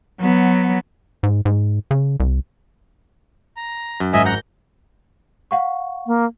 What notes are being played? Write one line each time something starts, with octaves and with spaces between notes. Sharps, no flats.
F#3 B3
G#2
G#2
C#3
C2
A#5
F#2
G#1 D#5 E5 G#5
F#5 A#5 G6 A#6
F5 F#5 C#6
A#3